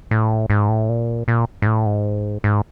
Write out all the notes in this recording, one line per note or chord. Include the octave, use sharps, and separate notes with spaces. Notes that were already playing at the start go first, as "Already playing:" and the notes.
A2
G#2
A2
A#2
A#2
G#2
A2
G#2
G#2